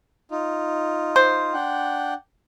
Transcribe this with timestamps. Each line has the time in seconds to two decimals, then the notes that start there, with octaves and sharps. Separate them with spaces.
0.31 D#4 F4
1.16 C5
1.54 D4 F#5 G5